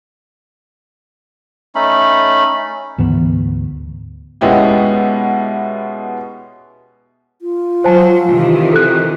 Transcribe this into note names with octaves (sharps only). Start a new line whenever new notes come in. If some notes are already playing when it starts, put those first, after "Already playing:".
A3 C#4 D#4 B5
D2 G#2 E3 B3
B2 G#3 B3 C#4 E4 G4
F4
F#3 C5 G#5 A5
C3 D#3 E3
A4 F#6